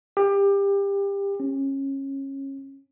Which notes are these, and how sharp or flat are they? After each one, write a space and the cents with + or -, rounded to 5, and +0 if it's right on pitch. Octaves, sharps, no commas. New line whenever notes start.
G4 +25
C#4 -25